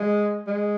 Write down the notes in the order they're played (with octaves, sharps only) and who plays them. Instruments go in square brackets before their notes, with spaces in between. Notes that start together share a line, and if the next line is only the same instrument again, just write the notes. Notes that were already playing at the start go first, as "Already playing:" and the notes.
Already playing: [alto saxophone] G#3
G#3